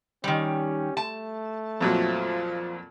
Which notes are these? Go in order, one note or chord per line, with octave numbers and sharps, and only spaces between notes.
D#3 G3 C#4
A3 A5
F2 A#2 F3 F#3